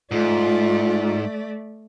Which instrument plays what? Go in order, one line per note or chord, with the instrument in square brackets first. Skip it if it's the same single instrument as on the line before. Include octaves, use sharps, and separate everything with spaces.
[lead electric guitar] G#2 [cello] A3 D5 [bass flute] F4